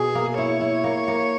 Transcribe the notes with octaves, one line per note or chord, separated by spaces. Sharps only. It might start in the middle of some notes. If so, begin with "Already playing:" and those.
Already playing: B2 G#4
A#3
E4 C#5
E4
A#3
A#3